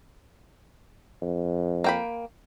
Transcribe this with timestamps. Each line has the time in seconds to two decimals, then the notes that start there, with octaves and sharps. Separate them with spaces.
1.22 F2
1.84 A#3 G5 B5